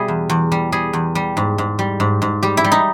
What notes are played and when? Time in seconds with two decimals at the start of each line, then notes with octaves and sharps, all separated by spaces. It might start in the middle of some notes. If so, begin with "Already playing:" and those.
Already playing: B2 G3 E4 G#4
0.08 E2
0.29 E2
0.52 G3
0.72 G3 G#4
0.93 E2
1.15 G3
1.37 G#2
1.58 G#2
1.79 G3
2.00 G#2
2.22 G#2
2.43 G3 G4
2.57 E4
2.64 G3
2.72 D#4